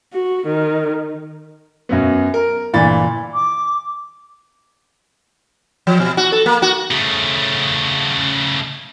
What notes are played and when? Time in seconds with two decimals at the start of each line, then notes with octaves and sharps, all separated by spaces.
0.13 F#4
0.47 D#3
1.89 F#2 F#3 B3
2.34 A#4
2.73 G1 A#2 E3 D4 B5 A6
3.33 D6
5.87 F3
6.00 B2
6.17 F#4
6.32 A4
6.46 A#3
6.62 F#4
6.91 C#3 A3